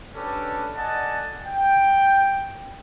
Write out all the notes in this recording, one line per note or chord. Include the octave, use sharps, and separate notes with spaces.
C#4 D4 G4 A4 B4 D5
A4 D5 D#5 F#5 G#5 A5
G5